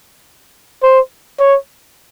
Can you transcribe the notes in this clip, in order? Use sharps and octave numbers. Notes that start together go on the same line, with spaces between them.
C5
C#5